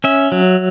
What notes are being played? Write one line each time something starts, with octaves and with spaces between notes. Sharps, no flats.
C#4 E5
F#3